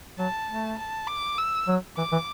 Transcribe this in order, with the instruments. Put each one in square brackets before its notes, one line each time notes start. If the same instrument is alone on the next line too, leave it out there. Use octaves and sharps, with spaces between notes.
[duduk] F#3 [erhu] A5
[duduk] A3
[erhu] A5
D6
E6
[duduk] F#3
[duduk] E3 [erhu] D6
[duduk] E3